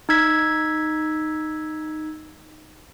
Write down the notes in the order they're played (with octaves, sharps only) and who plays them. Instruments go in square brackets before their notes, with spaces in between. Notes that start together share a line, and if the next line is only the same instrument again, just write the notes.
[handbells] D#4 E6 G#6 B6